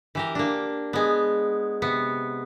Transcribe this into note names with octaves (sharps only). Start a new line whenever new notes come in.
E3 G4 A#4
A#3 D4
G#3 B3
C3 B3